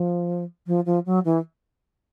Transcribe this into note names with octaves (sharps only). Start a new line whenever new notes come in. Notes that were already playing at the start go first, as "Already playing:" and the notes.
Already playing: F3
F3
F3
F#3
E3